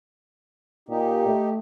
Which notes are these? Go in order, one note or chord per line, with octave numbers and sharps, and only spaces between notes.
A#2 D#4 G4
A3